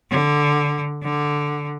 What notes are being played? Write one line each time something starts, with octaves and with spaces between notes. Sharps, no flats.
D3
D3